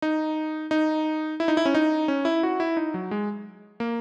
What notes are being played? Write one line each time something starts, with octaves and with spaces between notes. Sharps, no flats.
D#4
D#4
E4
D#4
E4
C#4
D#4
C#4
E4
F#4
E4
D#4
F#3
G#3
A#3